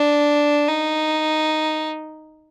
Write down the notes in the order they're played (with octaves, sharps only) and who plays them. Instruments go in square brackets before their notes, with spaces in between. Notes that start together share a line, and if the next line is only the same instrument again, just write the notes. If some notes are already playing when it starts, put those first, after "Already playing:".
Already playing: [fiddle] D4
D#4